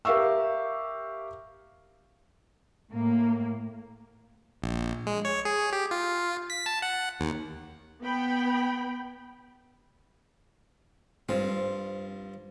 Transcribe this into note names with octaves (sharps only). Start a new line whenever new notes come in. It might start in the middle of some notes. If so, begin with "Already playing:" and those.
G4 A#4 E5 F5 C#6 E6
A2 A#3
A#1
G#3
C#5
G#4
G4
F4
B6
A5
F#5
D#2
B3 G5 B5
G2 F3 C4